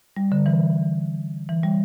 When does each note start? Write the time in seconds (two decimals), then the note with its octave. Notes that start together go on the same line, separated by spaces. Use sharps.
0.16 G3
0.32 D3
0.46 E3
1.49 E3
1.63 G3